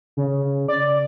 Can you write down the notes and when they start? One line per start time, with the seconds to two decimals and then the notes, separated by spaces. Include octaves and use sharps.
0.17 C#3
0.68 D5